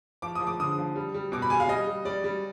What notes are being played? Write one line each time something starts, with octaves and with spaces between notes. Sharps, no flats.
F3 D6
D#6
F3
D6
D3 D#6
F3
G3
G3
B2 D6
B5
G3 G#5
F5
G3 D#5
G3
G3 D5
G3